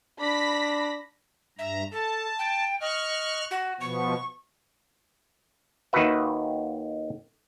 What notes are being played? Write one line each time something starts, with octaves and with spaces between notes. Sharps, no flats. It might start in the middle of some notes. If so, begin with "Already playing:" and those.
D4 B5 A#6 B6
G2 E5 A#5
A4 A5
G5
D#5 C#6 F6 F#6
F#4
B2 F3 B3 C#6
D#2 D#3 F4 F#4 B4 E5